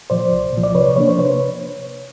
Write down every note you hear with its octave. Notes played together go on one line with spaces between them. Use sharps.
A#2 F3 C5 D5
C2
A#2 F3
D5
C3 B4 C#5
F3 A#3 D4 C#5
C5
C3 B4 C#5